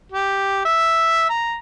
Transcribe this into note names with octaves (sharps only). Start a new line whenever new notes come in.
G4
E5
A#5